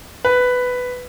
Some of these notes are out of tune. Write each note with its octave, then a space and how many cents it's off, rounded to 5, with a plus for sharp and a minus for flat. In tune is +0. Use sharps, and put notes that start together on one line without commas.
B4 +10